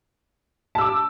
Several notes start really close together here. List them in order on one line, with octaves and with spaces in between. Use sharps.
A5 E6 D6